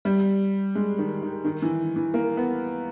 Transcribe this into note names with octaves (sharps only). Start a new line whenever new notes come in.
G3
G#3
D#3
D#3
D#3
E3
E3
A#3
B3